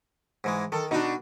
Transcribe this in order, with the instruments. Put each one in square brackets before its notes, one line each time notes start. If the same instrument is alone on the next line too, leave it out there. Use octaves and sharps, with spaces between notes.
[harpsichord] G#2 E3 G#3
[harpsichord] D#3 [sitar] A4
[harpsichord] B2 F#4 [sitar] D4 D#4